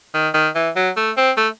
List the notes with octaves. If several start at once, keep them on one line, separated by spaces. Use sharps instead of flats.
D#3
D#3
E3
F#3
A3
C4
A3